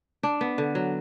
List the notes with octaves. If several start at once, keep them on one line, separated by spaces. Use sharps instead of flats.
D4
B3
D3
F#3